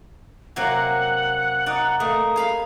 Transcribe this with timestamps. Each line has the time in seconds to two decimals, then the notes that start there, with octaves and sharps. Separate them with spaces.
0.56 C3 F#3 A#3 F#5
1.66 D#4 D5
2.00 A3 A#3 D#6
2.36 G#4 F5 B5